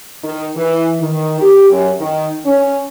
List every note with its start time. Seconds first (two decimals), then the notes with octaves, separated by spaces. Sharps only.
0.24 D#3
0.56 E3
1.00 D#3
1.41 G4
1.71 F#2
2.00 D#3
2.45 C#4